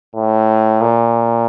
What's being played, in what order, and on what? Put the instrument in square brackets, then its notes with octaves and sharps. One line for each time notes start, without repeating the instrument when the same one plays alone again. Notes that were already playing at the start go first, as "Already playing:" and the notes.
[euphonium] A2
A#2